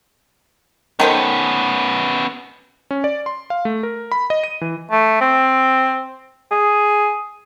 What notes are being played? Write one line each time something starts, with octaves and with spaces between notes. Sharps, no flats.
D#3 B3 C#4 A4 C5
C#4
D5
C6
F5
A3
A#4
B5
D#5
D#7
E3
A3
C4
G#4